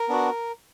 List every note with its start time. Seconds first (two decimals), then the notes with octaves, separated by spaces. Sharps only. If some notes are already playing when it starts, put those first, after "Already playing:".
Already playing: A#4
0.08 B3 D4 F#4